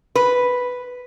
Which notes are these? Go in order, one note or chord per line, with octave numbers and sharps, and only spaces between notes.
B4